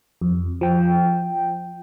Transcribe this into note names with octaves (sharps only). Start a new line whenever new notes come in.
F2
F3 G5